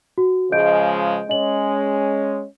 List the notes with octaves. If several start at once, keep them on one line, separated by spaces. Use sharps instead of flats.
F#4
C#3 F3 G#3 D#5 G6 D7
G#3 C#4 D#5 F#7